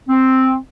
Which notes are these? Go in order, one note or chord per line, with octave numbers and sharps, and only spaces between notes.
C4